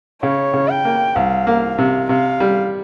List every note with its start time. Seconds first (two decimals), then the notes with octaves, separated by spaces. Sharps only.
0.22 C#3 C#5
0.53 C#3
0.69 G5
0.85 A#3
1.16 C2 F5
1.47 A#3
1.78 C3
2.09 C3 F5
2.40 G3